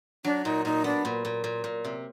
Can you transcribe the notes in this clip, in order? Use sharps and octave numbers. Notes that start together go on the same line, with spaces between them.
F#3 D4
A#2 D#4
A#2 D#4
B3 D4
A#2
A#2
A#2
A#2
C3